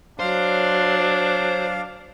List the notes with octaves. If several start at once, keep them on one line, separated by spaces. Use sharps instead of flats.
F#3 D4 C5 F5